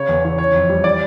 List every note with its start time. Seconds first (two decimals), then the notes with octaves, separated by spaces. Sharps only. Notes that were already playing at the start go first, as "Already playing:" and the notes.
Already playing: C#3 C#5
0.09 E2
0.24 E3 C#5
0.39 E3 C#5
0.54 F2
0.69 G3
0.84 E3 D5